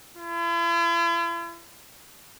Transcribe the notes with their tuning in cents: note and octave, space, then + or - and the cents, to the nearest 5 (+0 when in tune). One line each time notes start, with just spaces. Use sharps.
E4 +45